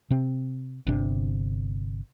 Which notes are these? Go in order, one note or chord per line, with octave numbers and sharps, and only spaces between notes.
C3 C4
G1 C3 D4